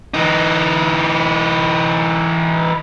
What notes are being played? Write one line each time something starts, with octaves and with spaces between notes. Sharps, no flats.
E3 D#4